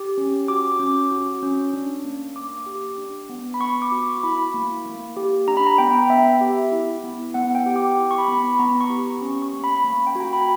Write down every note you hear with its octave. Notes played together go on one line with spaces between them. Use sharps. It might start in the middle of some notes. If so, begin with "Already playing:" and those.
Already playing: G4
C#4
F#4 D6
C#4
F#4
C#4
D4
A#3
A#3 D6
G4
D4
B3
B5
B3 C#6
D6
F#4
E4 B5
A#3
A#3
G4
D4 A#5
B5
A#5
B3 G5
B3 E5
G4
E4
B3
B3 F#5
G5
G4
D6
E4
C#6
B5
B3
B5
B3 A#5
C#6
G4
C#6
C#4
C#6
A#3
B5
A#3
G5
F#4 A#5
B5